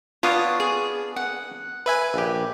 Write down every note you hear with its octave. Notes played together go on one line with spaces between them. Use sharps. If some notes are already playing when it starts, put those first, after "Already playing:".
B3 D4 F4 C#5 F5 D#6
G#4
F#5
B4 E5 G#5
A#1 G4